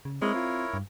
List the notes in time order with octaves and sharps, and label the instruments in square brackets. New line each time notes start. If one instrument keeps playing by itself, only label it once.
[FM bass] C#3
[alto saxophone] G#3 [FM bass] C4 [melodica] E4 A#4 C#5
[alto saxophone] F4
[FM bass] G2